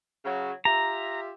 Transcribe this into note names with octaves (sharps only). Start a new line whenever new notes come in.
C#3 F#3
F4 G4 E5 A#5